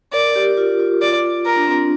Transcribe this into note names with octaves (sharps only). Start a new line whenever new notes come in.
A#4 D5
G4
F4
F4
D5
F4 A#4
D4
C4
D4